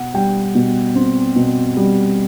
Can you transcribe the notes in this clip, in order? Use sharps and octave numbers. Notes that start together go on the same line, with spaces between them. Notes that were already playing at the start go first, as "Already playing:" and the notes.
Already playing: B2 F#5
G3 G5
B2
C4
B2
G3